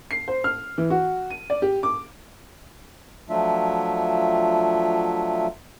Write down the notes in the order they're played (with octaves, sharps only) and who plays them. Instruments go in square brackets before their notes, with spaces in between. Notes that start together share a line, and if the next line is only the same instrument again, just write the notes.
[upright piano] C7
C5
F6
E3
F#4
D#7
D5
G4
D6
[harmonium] F3 F#3 A3 D4 F4 E5